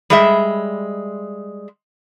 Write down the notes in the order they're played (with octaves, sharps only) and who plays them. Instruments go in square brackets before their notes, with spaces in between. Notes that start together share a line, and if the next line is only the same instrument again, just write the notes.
[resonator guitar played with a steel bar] G3 G#3 E5